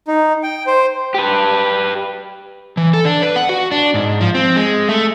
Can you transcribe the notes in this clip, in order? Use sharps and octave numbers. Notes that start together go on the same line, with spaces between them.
D#4
G5
C5
G4 B4
E3
A4
D4
B4
F#5
F#4
D4
G#2
F3
C4
G#3
A3